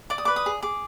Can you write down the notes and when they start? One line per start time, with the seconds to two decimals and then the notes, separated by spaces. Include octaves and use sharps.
0.10 D5 D6
0.18 D#6
0.25 B4 D6
0.36 D#6
0.46 G#4
0.62 G#4 D6